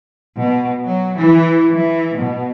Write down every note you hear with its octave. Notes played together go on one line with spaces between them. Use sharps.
B2
F#3
E3
E3
B2